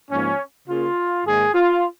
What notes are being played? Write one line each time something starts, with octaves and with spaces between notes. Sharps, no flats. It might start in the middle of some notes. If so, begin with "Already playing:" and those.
G#2 F3 A#3 C#4
C#3 A#3 F4
G#2 D#3 A#3 G#4
F4